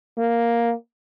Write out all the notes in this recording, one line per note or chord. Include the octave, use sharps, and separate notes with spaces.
A#3